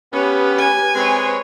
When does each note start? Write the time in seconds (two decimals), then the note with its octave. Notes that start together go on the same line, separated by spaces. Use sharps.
0.13 B3 C#4 G4 B4
0.59 G#5
0.95 G#3 C4 B4 C#5